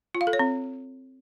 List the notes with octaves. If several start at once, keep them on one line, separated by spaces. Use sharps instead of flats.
F4
F5
A4
C#5
C4